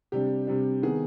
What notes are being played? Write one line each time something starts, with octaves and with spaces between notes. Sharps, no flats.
C3 G3 D4 G4
C3 G3 D4
D#3 B3 G#4